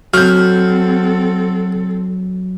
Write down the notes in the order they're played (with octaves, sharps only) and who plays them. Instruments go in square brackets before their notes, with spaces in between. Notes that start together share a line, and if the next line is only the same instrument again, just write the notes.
[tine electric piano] F#3 [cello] C4 A4 [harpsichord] F#4 [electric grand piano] F6 G6